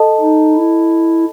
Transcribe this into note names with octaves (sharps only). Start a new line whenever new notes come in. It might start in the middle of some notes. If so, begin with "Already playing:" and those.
Already playing: A4 D#5 A5
D#4
E4